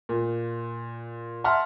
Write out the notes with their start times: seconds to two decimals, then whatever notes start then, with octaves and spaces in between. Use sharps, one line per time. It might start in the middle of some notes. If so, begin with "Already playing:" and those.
0.09 A#2
1.44 E5 F#5 A5 A#5 C6 F6